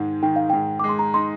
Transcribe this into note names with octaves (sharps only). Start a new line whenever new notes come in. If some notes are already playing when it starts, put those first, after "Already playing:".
Already playing: G#2 D#3 G#3
D#3 G5
F5
G#2 G5
G#3 D6
C6
A#5
D#4 C6